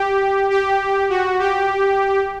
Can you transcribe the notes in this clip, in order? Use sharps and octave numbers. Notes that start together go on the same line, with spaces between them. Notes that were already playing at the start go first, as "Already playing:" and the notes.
Already playing: G4
G4
F#4
G4